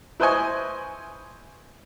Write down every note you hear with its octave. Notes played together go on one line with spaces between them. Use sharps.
E4 B4 C5 D#5 G#5 C#6